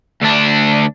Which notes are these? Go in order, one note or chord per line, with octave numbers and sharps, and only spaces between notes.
D2 D4